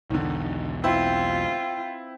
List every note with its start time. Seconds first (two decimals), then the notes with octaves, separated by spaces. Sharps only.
0.10 B1 E2 D3 D#3
0.84 C4 E4 F4